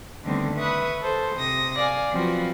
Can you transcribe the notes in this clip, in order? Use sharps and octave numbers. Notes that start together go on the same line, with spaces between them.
D3 D#3 G3 A3 B3 C4
B4 E5 B5 C#6 D#6 F#6
A4 C5
C3 D#6 A#6
D5 F5 G#5
F3 F#3 C4 F4 F#4 B4